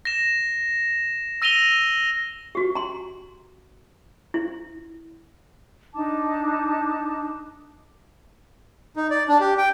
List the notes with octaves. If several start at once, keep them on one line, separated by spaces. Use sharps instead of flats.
A#6 E7
E6 A#6 D#7 F7 G7
F#4 G4
A#5 C6
E4
D4 D#4 A5 D6
D#4
D5
D4
G4
G5